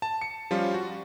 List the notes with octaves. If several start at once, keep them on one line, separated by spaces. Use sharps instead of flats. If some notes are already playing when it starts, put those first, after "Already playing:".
A5
C#7
F3 G3 C#4 F4
F#4